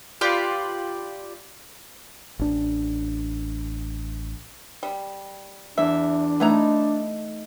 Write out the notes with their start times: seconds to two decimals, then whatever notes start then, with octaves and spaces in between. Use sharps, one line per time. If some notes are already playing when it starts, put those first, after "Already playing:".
0.21 F4 G4 B4 D5
2.39 A1 D4
4.83 G3
5.78 E2 D4 E5
6.40 A3 B3 D#4 E4 A#5